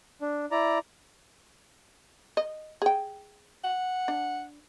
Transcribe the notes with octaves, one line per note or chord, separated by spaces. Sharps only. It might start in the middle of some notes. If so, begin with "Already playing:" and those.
D4
E4 D5 A#5
D#5
G#4 G5
F#5
D4